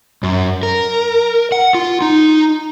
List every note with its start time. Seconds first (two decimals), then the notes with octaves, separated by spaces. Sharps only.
0.23 F#2
0.63 A#4
1.52 F#5
1.75 F4
2.02 D#4